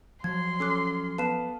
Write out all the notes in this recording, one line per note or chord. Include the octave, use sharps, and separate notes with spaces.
F3 F#3 C6 G#6
C#4 A4 D6 F#6
B3 B4 F5 A5 C7 E7